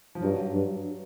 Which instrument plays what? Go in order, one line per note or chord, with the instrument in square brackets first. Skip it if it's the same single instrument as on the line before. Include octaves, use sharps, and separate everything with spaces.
[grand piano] F3
[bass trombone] G2 [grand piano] F#3
[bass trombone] G2